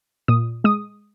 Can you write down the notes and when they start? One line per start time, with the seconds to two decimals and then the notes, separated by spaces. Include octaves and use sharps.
0.28 A#2 D#6
0.64 G#3 D#6